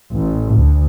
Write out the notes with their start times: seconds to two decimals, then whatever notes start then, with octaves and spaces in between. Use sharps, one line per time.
0.12 A1
0.54 D2